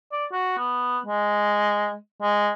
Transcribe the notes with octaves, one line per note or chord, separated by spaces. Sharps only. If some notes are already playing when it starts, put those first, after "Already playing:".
D5
F#4
B3
G#3
G#3